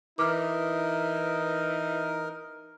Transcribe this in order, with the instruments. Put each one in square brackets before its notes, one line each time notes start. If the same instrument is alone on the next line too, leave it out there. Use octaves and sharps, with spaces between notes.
[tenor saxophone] E3 [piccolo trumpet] D#4 [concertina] A#4 [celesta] D6 F6